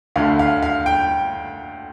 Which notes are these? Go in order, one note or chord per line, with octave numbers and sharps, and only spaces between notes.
D2 D3 A3 F5
F5
F5
G5